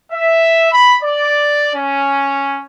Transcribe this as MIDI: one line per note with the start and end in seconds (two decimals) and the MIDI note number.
0.12 0.70 76
0.72 0.95 83
1.02 1.71 74
1.75 2.63 61